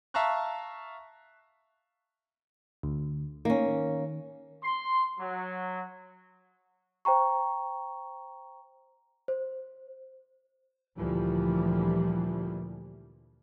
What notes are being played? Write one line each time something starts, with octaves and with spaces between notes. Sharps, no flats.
E5 F5 A5 A#5 C#6 F#6
D2
D#3 A#3 C#4
C6
F#3
C5 G5 A#5 C#6
C5
D2 A#2 E3 F3 G3